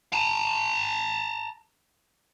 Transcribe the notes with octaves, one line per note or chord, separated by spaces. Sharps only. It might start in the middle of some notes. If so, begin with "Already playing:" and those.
A5 A#5